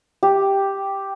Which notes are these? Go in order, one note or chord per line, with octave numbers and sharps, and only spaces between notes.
G4